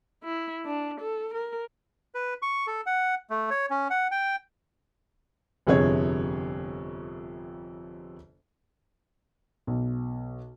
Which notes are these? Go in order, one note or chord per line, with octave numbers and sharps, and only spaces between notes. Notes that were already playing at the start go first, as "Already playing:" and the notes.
E4
D4
A4
A#4
B4
C#6
A4
F#5
A3
C#5
C#4
F#5
G5
G1 F2 C3 G#4 C#5 G#6
B1